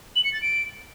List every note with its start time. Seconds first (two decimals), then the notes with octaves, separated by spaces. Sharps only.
0.16 F#7
0.24 C#7
0.33 A6
0.42 D7